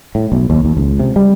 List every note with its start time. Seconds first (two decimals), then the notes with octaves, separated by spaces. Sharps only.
0.15 A2
0.32 B1
0.50 D#2
0.65 D#2
0.77 C#2
0.99 C3
1.16 G3